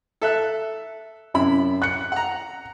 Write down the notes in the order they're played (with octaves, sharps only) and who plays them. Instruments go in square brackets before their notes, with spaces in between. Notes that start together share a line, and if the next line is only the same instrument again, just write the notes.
[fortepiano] A4 E5 F#6
[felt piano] F#2 [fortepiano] C3 E4 B5
[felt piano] F#6 C#7
[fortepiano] F#5 A#5